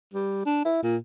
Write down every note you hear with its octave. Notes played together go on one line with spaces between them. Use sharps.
G3
D4
E4
A#2